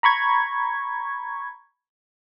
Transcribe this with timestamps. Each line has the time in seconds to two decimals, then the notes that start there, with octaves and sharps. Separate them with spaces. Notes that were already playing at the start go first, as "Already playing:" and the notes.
0.03 A#5 B5 C#6 G#6